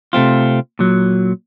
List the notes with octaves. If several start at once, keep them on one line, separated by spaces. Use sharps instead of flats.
C3 A3 C4 F4
A#2 F#3